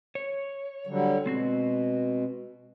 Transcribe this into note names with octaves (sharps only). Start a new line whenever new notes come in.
C#5
D3 F#3 G3
B2 G#3 C4 F#4